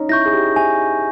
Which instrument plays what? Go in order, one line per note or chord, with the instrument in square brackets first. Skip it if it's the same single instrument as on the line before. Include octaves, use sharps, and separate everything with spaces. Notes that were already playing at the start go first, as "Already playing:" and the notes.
Already playing: [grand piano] C#4 D#4
[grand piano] E4 [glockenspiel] C#6 G6 A#6
[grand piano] G#4
G4
[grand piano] E4 [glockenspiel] G#5